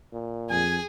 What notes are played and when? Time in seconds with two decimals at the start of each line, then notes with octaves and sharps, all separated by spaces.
0.12 A#2
0.50 F2 G#4 G#5